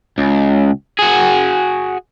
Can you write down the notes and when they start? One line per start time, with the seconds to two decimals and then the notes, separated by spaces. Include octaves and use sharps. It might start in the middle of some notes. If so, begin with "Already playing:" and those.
0.18 C#2
0.99 F#4 G#4